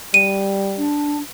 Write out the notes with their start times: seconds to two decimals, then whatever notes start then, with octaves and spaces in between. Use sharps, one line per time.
0.14 G3 D#7
0.78 D4